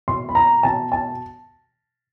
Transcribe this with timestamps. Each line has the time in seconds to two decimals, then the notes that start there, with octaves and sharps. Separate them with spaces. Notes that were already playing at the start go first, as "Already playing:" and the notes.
0.08 B2 C6
0.29 B5
0.35 A#5
0.63 B2 A5
0.92 A5